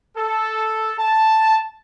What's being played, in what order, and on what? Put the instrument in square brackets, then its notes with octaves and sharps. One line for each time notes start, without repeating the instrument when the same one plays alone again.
[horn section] A4
A5